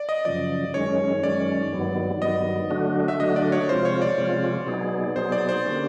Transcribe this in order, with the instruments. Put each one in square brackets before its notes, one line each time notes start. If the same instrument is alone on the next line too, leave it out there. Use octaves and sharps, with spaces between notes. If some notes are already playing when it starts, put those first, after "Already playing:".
Already playing: [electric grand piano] D5
D#5
[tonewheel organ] F#2 C#3 F3 [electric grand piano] D5
[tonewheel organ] F#2 D#3 G#3 C#4 [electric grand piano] C#5
[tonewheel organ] F#2 D#3 G#3 C#4 [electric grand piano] D5
[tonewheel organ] G2 D#3 F#3 B3
[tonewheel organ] G2 D#3 F#3 B3 [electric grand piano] D#5
[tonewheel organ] D3 F#3 A3 D4 F#4
[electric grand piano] E5
[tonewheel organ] D3 F#3 A3 D4 F#4 [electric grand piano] D#5
[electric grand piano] D5
C#5
[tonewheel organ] C3 F3 G#3 C4 F4 [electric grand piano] C5
[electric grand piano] C#5
D5
[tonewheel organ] C3 F3 G#3 C4 F4
B2 F#3 B3 D#4 G#4
[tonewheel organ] B2 F#3 B3 D#4 G#4 [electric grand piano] C5
[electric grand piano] D5
C5
[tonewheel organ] D3 G3 A#3 C#4